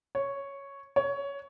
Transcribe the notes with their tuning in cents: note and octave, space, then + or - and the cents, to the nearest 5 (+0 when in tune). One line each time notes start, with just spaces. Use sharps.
C#5 +0
C#5 +15